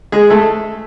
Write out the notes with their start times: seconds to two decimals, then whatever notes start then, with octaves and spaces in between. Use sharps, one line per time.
0.12 G#3 G#4
0.30 A3 A4